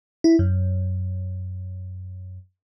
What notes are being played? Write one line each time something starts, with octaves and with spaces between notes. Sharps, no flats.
E4
F#2